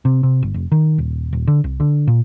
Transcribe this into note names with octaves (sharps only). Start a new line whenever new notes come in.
C3
C3
G1
F1
D#3
D#1
D#1
D3
C2
D3
A#2